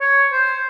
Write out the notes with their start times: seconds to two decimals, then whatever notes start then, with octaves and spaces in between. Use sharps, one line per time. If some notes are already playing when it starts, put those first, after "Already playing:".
0.01 C#5
0.32 C5